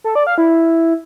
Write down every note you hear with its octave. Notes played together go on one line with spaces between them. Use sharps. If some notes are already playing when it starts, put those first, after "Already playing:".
A4
D5
F5
E4